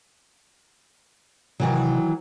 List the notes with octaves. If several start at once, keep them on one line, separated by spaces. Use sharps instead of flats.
C3 D#3 E3 F#3